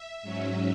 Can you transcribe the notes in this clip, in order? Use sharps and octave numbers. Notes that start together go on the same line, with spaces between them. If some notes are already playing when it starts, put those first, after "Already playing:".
Already playing: E5
G#2 F#3 C#4